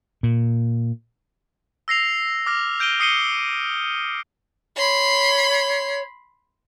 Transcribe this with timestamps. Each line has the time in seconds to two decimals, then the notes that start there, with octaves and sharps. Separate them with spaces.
0.23 A#2
1.88 E6 A#6 C7 F7
2.46 D6 F6 A#6
2.79 F6 G6 D7 D#7 G7
3.00 D#6 C7 C#7 D#7 G7
4.77 C#5 B5 C6